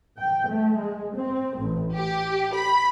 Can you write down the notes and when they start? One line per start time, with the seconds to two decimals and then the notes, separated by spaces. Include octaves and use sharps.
0.19 G5
0.48 A3
0.79 G#3
1.16 C4
1.57 A1
1.94 G4
2.53 B5